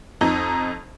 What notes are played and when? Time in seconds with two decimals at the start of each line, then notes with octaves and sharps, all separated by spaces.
0.21 F2 D#4